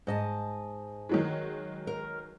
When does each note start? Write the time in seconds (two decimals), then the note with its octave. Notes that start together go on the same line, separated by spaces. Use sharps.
0.07 G#2 D#5 A5
1.09 D#3 F#3 G#3
1.87 A#4